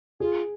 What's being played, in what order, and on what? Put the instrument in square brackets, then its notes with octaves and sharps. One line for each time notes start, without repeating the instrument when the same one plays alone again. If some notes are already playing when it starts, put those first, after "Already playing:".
[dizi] F4 [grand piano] G#4